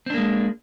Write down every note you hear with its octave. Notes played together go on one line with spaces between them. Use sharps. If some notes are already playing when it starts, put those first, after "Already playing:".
G#3 A#3 C4 D4